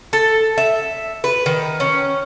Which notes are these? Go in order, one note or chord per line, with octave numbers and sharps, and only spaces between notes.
A4
E5
B4
D#3
C#4